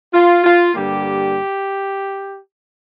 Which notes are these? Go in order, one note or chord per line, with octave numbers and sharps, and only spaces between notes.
F4
F4
G2 D3 G3 A#3 G4